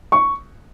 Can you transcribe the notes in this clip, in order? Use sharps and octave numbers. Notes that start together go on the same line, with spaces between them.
C#6